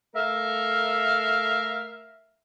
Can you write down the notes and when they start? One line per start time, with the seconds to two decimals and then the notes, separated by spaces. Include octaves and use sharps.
0.15 A3 A#4 E5 F5